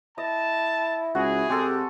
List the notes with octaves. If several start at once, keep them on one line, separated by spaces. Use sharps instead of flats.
E4 D#5 A5
C#2 F#4 G#4
C3 G#3 G4 A4